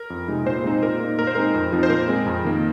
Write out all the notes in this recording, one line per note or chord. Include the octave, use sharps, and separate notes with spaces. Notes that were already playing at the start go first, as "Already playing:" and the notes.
Already playing: A#4
F2
C3 G#3 D#4
A#2 C5
G#3 C4 D#4
A#2 A#4
A#3 D#4
A#2 A#4
C5
G#3 C4 D#4 A#4
F2
F3 C4 D#4
C5
A#2 A#4
G#3 C4
F2
D#3 A#3